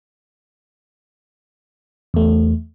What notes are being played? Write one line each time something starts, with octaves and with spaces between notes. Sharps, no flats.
E2 A3